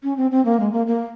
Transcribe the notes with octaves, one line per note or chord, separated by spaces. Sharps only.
C#4
C4
C4
A#3
G#3
A#3
A#3